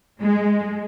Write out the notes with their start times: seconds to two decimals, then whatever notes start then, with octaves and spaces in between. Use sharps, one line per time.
0.23 G#3